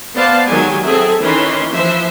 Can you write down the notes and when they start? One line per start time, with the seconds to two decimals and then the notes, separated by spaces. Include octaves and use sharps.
0.15 B3 C5 D5 F5 A5
0.47 D#3 F#3 G#3 G4 G#5
0.84 F#3 C4 G#4 A4 E5
1.21 D#3 E3 C#4 B5 C6
1.73 E3 F3 C5 E5